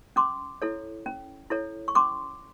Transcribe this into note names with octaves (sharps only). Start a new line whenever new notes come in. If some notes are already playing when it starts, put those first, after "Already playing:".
C#4 C6 D6
E4 A4 C#5
C#4
E4 A4 C#5
C#6
C#4 C6 D6